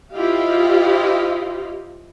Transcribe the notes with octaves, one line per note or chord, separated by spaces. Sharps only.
E4 F4 G4 C5 D#5 F5